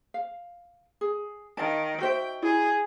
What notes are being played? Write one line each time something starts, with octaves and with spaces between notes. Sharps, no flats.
F5
G#4
D#3 F5 A5 D7
F#4 C5 E5 G5
E4 G#4